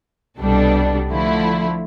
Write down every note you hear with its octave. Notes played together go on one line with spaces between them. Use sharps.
C2 B2 G3 D4 A4
D3 F3 A3 E4